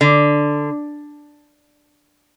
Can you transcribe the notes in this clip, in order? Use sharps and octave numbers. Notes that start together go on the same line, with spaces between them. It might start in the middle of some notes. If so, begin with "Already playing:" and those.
D3